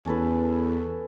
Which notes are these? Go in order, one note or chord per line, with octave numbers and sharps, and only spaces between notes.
E2 C#4 A4 B4